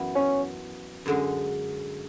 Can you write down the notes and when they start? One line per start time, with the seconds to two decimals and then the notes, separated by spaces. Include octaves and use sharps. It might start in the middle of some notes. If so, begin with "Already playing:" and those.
Already playing: F#2 E3 B3 E4
0.15 C#4
1.06 F#2 D3 G#3